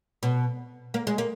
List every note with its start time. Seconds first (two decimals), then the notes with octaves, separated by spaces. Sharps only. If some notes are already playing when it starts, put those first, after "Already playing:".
0.23 B2
0.94 A#3
1.07 G#3
1.18 A#3